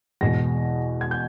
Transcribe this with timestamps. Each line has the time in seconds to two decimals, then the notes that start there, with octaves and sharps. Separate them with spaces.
0.21 E2 B2 G#3 A#6
1.01 G#6
1.11 G6